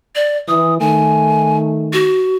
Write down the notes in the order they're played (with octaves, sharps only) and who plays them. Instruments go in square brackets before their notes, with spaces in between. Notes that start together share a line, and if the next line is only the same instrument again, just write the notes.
[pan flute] D5
[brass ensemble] E3 [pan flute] D#6
[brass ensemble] D#3 A3 [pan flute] G#5
[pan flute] F#4